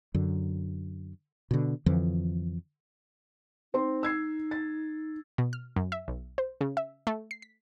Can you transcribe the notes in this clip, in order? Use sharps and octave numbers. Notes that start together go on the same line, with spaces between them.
F#2 D3
B2 D3
F2 D3 E3 F3
C4 D#4 C6
E6 G#6 C7
A6
B2
F6
F#2
E5
B1
C5
C#3
E5
A3
C7
B6